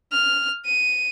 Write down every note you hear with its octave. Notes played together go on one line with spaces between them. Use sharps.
F6
D#7